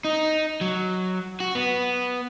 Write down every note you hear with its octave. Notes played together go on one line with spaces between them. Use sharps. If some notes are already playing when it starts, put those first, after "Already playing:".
D#4
F#3
F#4
B3